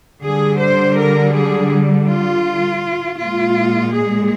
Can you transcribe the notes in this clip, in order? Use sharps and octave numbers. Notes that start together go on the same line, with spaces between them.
D3 G3 G#4
C5
A#4
G#4
F4
A#2 G#3 F4
G#4